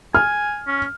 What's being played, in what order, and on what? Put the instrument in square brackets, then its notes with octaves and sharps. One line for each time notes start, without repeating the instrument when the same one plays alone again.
[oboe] G#5 [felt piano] F6
[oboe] C#4